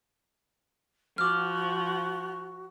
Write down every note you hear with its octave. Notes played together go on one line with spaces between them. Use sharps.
F3 F#4 D6 F6